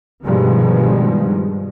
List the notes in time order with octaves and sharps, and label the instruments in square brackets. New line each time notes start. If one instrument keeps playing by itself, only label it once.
[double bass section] G2 B2 D#3 F3 G3 G#3